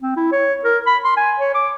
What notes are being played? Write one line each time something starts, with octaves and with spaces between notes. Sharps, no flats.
C4
E4
C#5
A#4
B5
C6
G#5
C#5
D6